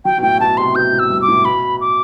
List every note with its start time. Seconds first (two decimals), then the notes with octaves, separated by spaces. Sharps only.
0.05 F#3 G5
0.18 B2
0.22 A2 G5
0.40 B2 A5
0.57 C3 C6
0.75 B2 G6
0.93 A2
0.99 E6
1.10 G2
1.22 D6
1.28 A2
1.45 B2 B5
1.81 D6